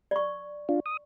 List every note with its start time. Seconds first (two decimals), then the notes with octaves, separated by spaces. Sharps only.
0.11 D5 C#6
0.69 D4 F4
0.86 D#6